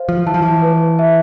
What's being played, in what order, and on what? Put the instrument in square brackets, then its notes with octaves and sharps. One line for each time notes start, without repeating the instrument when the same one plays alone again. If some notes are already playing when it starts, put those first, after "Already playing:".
Already playing: [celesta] C5 F5
[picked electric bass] F3
[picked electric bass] E3 [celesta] A5
[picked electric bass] F3
E3
[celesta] B4
E5